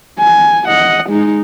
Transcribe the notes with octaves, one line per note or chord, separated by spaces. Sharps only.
G#5
D#5 F#5
G#3 D#4